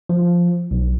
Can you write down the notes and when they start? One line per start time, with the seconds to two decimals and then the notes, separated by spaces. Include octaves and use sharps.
0.09 F3
0.71 B1